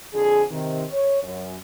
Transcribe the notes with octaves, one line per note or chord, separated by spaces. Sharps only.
F2 D3 G#4
C3 D#3
C#5
F#2